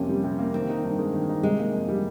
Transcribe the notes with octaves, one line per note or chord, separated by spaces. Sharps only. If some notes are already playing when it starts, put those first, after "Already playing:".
Already playing: F2 C3 A#3 C#4
G3
C3
A#3
D#3 C4
D#4
G2
G#3
D#3
D#4
C3 G#3
A#3
F2
G3